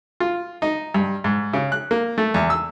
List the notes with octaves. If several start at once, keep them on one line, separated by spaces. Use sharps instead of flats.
F4
D#4
G2
G#2
C#3
F#6
A#3
A3
E2
E6